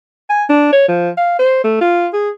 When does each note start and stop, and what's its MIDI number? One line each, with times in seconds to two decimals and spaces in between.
0.30 0.44 80
0.50 0.73 62
0.73 0.87 73
0.89 1.10 53
1.17 1.39 77
1.39 1.63 72
1.64 1.79 57
1.81 2.08 65
2.13 2.30 68